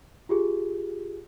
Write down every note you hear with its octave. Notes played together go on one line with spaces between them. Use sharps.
F4 G4 G#4